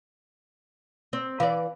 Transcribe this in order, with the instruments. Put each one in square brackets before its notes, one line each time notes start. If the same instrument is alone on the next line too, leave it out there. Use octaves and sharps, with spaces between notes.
[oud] C4
[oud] E3 D5 [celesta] F5